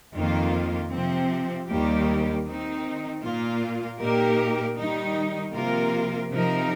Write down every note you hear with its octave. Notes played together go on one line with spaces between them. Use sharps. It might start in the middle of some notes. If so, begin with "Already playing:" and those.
F2 D#3 A#3 F4
C3 F3 C4
D#2 D#3 G3 A#3 G4
D#3 C4 D#4
A#2 A#3 F4
A#2 A#3 D#4 G4 A#4
D#3 G3 D#4
C3 F3 A#3 F4 A#4
C3 F3 D#4 A#4